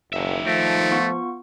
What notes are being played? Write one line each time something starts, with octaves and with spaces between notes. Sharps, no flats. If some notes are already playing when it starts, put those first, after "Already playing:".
F#1 D#3 E5
F3 A3 A#6 D7
B3 F4 C#6